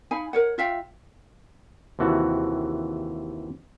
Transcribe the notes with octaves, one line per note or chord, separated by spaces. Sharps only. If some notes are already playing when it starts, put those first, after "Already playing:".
D#4 F5 G#5 B5
A#4 C#5 F#5
F4 E5 F5 G5
D#2 C3 E3 F#4 A5